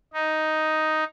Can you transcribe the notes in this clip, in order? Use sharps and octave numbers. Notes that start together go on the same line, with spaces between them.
D#4